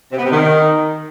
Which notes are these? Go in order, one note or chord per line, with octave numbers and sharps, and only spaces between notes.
C3
B3
C3
D#3